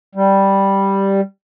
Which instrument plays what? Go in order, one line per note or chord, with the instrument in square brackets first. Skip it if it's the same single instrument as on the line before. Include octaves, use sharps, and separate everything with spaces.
[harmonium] G3